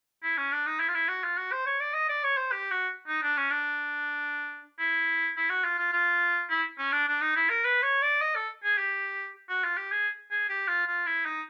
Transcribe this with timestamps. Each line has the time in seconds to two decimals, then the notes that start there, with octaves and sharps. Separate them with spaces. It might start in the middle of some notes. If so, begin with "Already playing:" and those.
0.23 E4
0.38 C#4
0.52 D4
0.66 D#4
0.80 E4
0.88 F4
0.94 E4
1.08 F#4
1.23 F4
1.38 F#4
1.52 C5
1.66 C#5
1.80 D5
1.94 D#5
2.09 D5
2.23 C#5
2.37 C5
2.51 G4
2.71 F#4
3.08 D#4
3.23 D4
3.37 C#4
3.51 D4
4.79 E4
5.37 E4
5.50 F#4
5.64 F4
5.78 F4
5.93 F4
6.50 E4
6.78 C#4
6.92 D4
7.08 D4
7.21 D#4
7.35 E4
7.49 A#4
7.64 B4
7.83 C#5
8.02 D5
8.21 D#5
8.36 A4
8.64 G#4
8.77 G4
9.49 F#4
9.64 F4
9.77 G4
9.92 G#4
10.31 G#4
10.49 G4
10.68 F4
10.87 F4
11.06 E4
11.25 D#4